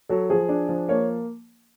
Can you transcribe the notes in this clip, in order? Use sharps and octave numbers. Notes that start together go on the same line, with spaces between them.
F#3 A4
F3 G#4
D4
F3
A#3 C#5